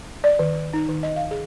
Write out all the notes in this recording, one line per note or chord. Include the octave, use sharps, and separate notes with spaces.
D5
D#3
D#4
D#3
D#5
F5
G#4